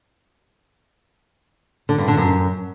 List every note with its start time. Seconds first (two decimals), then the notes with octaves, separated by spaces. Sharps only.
1.89 D3
1.98 G2
2.08 D3
2.17 F#2